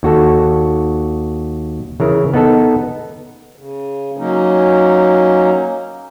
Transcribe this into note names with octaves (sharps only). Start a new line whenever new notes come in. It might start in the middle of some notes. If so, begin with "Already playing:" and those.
D#2 F#4 A4
C#3 E3 A#4
B3 D#4 A4
C#3
F#3 A#3 C#4 D#4